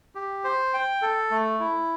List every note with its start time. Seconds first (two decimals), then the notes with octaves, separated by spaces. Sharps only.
0.15 G4
0.44 C5
0.74 G5
1.02 A4
1.31 A3
1.60 E4